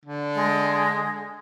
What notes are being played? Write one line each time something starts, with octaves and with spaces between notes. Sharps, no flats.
D3
G#3